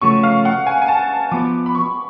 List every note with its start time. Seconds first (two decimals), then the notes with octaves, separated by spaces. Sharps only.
0.01 C#3 F3 A3 C#4 F#4 C#6
0.23 F5
0.45 F#5
0.67 G#5
0.82 G#5
0.88 A5
1.32 F3 B3 F#4 D6
1.66 B5
1.75 C#6